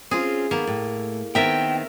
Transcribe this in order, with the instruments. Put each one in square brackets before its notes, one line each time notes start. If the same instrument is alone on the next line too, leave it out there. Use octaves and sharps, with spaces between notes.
[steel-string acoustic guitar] C4 C#4 F4 [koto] G#4
[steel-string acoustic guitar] D#3 B3 [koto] A#3
[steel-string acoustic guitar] A2
[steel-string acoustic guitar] D#3 B3 C4 [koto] A#4 E5 [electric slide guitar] G5